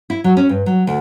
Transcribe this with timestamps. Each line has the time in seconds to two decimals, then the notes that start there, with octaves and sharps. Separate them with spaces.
0.10 E4
0.24 F#3
0.37 C#4
0.49 G2
0.66 F#3
0.87 D2